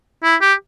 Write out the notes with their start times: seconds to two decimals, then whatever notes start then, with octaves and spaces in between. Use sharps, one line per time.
0.23 E4
0.41 G4